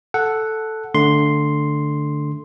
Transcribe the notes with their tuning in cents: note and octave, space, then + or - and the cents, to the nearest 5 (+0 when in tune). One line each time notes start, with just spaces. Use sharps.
A4 +0 F#5 +0
D3 +0 A3 +0 C6 +0